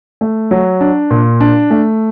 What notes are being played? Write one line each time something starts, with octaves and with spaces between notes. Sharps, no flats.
A3
F#3
D4
A#2
D4
A3